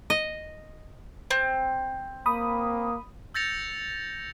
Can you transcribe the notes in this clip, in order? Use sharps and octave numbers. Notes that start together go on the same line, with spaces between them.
D#5
C4
A#3 B5 D#6
E6 G6 A6 A#6 C#7 F7